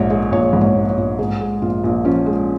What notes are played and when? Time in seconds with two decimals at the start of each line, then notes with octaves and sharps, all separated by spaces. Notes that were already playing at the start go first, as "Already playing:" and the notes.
Already playing: A#1 G#2 G#3 C#5
0.10 G#3
0.31 A#1 C#5
0.53 G#2
0.61 C#5
0.75 A#1
0.90 C#5
0.97 A#1
1.19 G#2 G#4
1.41 G#3
1.62 A#1 F4
1.84 A#1
2.05 F3 C#4
2.26 G#3